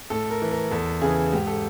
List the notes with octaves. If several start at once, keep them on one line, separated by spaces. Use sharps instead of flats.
A2 A4
A#4
E3
A#4
E2 A4
C#3 E3 G#4
G#2 G4
A4